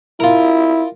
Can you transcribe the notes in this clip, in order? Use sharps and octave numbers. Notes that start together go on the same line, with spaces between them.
E4 F4 A#4